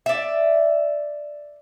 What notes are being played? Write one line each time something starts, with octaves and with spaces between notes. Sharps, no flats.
D5 E5